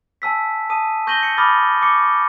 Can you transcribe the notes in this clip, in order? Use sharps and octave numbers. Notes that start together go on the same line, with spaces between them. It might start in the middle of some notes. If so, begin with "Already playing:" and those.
G#5 A5 E6 B6
A5 D#6 D#7
C#6 G6 A#6 D#7 F#7 G7
C#7
B5 D6 D#6 F6 A6
C#6 D6 C#7